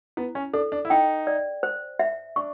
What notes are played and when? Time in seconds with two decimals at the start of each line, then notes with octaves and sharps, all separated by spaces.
0.17 B3 E4
0.35 C#4
0.53 D4 A4
0.72 D4
0.85 E4
0.90 D#4 G5
1.27 D5
1.63 C5
1.99 E5
2.36 D4 C#6